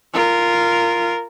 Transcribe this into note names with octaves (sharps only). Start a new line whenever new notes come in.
F4 A#4